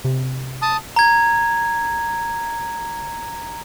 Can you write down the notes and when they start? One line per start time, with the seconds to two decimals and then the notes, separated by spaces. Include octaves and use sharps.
0.05 C3
0.62 A5 D#6
0.96 A#5 G#6